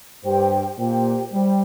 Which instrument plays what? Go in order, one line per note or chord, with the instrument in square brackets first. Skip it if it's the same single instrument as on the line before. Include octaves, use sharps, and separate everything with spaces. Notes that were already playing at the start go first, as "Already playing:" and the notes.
[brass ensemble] G2 [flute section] G4 C5 G5
[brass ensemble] A#2 [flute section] G4 C5 G5
[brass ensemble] G3 [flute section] G4 C5 G5